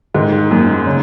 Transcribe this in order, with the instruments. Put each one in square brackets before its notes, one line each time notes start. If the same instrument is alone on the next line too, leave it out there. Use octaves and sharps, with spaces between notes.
[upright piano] G#2 [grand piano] D#3
[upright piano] F#2 [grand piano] A#3
[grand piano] C#3